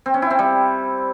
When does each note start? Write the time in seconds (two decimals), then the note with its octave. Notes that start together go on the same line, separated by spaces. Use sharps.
0.06 C4
0.14 C#4
0.22 E4
0.30 C4
0.39 G3